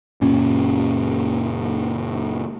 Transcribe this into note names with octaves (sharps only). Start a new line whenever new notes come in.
F#1 A#2 C#4